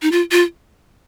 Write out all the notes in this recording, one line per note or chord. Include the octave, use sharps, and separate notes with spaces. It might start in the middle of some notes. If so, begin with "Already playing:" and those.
D#4
F4
F4